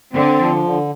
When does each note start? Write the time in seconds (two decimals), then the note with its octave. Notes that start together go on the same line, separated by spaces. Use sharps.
0.13 D3 C4
0.38 F3
0.63 D3